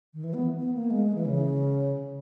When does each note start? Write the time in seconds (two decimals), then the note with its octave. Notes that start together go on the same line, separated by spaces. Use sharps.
0.14 D#3
0.24 E3
0.34 B3
0.59 B3
0.74 A#3
0.90 G#3
1.05 G#3
1.15 E3
1.25 C#3